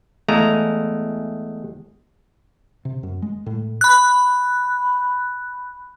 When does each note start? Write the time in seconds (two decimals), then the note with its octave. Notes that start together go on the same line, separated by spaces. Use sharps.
0.28 E2 G#3 A3 F5 A#5
2.85 C3
3.03 F#2
3.22 G#3
3.46 A2
3.81 B5 F#6